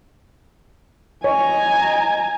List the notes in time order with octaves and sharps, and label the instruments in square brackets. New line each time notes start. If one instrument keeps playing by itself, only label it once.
[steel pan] C#5 [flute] D#5 [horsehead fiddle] G#5 A#5